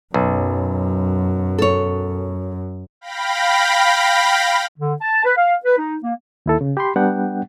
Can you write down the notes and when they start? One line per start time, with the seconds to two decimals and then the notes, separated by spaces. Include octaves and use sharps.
0.14 B1 F#2
1.58 A4 C#5
3.01 F5 G5 B5 A#6
4.78 D3
5.01 A5
5.24 B4
5.37 F5
5.64 B4
5.77 D#4
6.03 A#3
6.46 D#2 E4 A4
6.61 C#3
6.77 G4 B5 C6
6.96 G3 B3 D4 F#5 G5